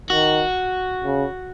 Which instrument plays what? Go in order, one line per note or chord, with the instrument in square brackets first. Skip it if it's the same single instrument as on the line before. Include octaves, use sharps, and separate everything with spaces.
[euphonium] D#3 [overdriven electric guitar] F#4
[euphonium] C#3